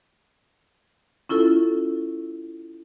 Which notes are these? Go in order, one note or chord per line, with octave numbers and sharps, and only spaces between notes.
C#4 E4 F4 A4